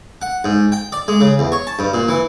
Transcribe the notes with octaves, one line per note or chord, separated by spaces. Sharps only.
F#5
G#2
G5
D5
G#3
C#3
E2
C#5
A5
G2
A#2
E3